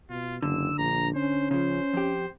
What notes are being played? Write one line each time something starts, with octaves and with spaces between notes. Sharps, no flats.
B2 F4
F#1 D3 E6
A#1 A#5
C#4 C5
C#3 F3 C5
F2 G4